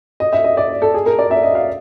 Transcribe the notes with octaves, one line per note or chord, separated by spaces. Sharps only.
D#5
E5
D#5
D5
A4
G#4
A#4
D5
E5
D#5
F5